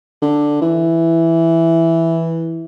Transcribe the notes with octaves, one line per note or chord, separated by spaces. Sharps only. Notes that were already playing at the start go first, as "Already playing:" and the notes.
D3
E3